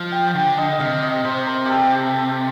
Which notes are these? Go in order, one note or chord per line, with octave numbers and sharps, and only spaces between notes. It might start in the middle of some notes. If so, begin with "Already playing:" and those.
Already playing: F3 F5
G5
D3 G5
D#5
D#5
C3 F5
D#5
C3 C5
A#4
G4 A4
G4
A4